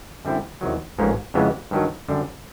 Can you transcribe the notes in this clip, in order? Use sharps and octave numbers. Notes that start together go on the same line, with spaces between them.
F#2 D3 G3 C4 E4
E2 C3 D#3 F#3
A1 G#2 F3 A#3 C#4
F2 C#3 E3 G#3 B3
G2 D#3 F#3
F#2 D3 G3